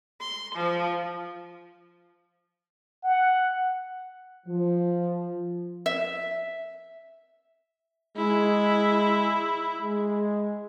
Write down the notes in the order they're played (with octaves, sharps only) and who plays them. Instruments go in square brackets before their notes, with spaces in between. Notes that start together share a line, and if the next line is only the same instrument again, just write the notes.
[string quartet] C6
F3
[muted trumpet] F#5
[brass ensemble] F3
[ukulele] E5
[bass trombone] G#3 [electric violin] E4
[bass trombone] G#3